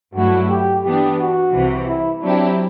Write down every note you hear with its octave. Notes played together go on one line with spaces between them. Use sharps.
G2 F#3 A3 E4 F#4
G4
E3 B3 D4 G4
F#4
C2 C3 E3
E4
F#3 C4 D4 E4 G4